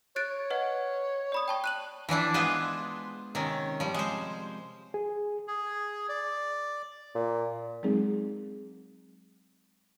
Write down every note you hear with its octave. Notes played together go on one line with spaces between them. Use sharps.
C#5 F#6 A6 D7
B4 D#5 F#5
D5 B5 D#6
G5 A5 C#6
F#6 D#7 F#7
E3 F3 D4 E4
G#3 B3 F4 B4 C5
C3 D#3 C#4
F3 G3
G#3 C5
G#4
G#4
D5
A#2
F#3 G#3 C4 D#4 G#4